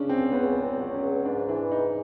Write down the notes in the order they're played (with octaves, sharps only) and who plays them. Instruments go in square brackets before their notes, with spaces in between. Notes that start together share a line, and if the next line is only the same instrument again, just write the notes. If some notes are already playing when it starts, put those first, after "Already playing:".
Already playing: [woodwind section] C#3 [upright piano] C#4 D4
[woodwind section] C#2 [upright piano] C4
[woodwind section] C#3 [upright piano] B3
[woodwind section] C#2
[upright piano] C4
[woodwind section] F#3
[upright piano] C#4
[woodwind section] C#2
[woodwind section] G#2 [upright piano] D4
[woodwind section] E3 [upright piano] D4
[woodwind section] G#2 [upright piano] D#4